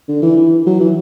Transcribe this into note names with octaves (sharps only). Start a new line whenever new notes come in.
D3
E3
E3
F#3
E3